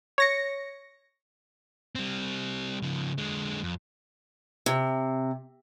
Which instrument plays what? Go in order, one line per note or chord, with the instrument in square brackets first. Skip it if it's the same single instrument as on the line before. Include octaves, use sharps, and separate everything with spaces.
[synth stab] C#5 A#6 C#7
[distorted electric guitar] G3 C4
C#3 F3
D3 G#3
F2
[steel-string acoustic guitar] C3